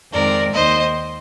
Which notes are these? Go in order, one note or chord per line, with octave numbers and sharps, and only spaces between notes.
F2 D#3 G#3 C4 A#4 D5
D#2 D#3 A#3 C5 D#5